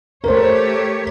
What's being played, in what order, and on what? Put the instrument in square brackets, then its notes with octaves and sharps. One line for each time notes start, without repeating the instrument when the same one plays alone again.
[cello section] A3 G4 C#5 [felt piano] A#4 C5